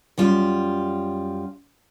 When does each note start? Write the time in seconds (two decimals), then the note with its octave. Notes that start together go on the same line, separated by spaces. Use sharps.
0.18 F#2 G3 F4